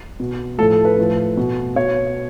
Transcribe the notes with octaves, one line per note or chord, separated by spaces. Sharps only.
B2
A2 F3 A4
A4
B4
A2 F3
B2
B2 C#5